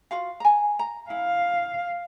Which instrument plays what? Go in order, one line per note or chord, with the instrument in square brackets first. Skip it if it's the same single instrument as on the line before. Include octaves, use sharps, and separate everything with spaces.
[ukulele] F4 F#4 F5
G#5 A#5
A#5
[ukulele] E4 [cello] F5